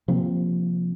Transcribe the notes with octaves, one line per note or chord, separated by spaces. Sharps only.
C3 F3 A#3 C4